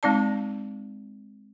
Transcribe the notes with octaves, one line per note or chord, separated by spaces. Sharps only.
G#3 C4 D#4 D5 A5